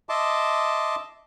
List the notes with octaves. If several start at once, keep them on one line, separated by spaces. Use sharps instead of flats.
D#5 E5 A5 C6 D6